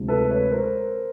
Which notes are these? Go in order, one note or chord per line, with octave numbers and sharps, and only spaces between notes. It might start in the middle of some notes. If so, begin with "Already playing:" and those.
Already playing: D2 C3 F3 G#3
A4 B4
B4 C#5
A#4 C5